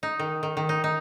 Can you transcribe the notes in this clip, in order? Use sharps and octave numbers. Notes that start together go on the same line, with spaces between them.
D#4
D#3
D#3
D#3
D#4
D#4